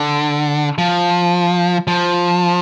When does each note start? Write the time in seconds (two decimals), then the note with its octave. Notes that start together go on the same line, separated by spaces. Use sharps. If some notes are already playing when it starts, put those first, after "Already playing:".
Already playing: D3
0.78 F3
1.87 F3